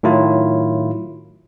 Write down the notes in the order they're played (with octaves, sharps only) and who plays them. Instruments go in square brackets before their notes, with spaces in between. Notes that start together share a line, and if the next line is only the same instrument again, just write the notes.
[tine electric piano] A2 D#3 F#3 E4 F4